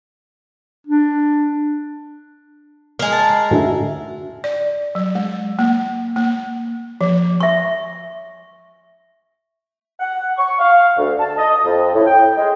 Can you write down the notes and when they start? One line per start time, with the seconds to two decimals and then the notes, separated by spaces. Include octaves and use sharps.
0.87 D4
2.99 G#3 A#4
3.12 A5
3.51 A2 D3 F#4 E5
4.44 D5
4.95 F#3
5.15 G#3
5.59 A#3
6.16 A#3
7.01 F3
7.40 E5 C#6
10.00 F#5
10.38 C#6
10.59 F5
10.97 D2
11.20 A5
11.38 D#5
11.65 F2
11.95 A2
12.07 G5
12.38 G#3